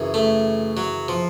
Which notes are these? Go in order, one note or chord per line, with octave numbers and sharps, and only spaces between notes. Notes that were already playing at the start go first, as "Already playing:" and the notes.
Already playing: F#2 C#3 E3
A3
F#3
F3